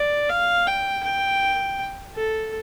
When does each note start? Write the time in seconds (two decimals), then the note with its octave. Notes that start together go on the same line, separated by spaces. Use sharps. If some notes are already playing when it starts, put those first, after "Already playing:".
Already playing: D5
0.29 F5
0.67 G5
1.03 G5
2.16 A4